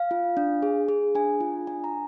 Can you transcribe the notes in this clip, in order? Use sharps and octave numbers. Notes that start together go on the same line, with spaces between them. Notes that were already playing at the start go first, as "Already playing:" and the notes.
Already playing: F5
F4
D4
G#4
G#4
D4 G#5
F4
D4 G#5
A#5